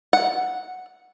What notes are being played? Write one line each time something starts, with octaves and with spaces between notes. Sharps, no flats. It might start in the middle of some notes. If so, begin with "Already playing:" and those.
F#5